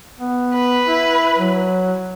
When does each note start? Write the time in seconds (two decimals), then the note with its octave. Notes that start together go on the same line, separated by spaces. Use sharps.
0.19 B3
0.54 B4
0.87 E4
1.38 F#3